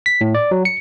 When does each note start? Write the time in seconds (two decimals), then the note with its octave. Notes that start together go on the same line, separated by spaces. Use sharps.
0.06 B6
0.21 A2
0.35 D5
0.51 F#3
0.65 C#7